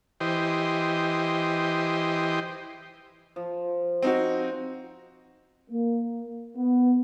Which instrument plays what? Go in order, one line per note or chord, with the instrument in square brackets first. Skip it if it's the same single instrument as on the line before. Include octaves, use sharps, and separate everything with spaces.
[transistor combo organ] E3 G4 C5 D#5
[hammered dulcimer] F3
[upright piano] C4 D#4 F#4
[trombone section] A#3
B3